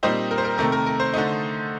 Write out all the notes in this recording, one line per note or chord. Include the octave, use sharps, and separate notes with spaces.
A#2 G3 C4 D#4 C5
A#4
C5
A#4
C3 D#3 A3 A#4
A#4
A#4
C5
D3 A3 D#4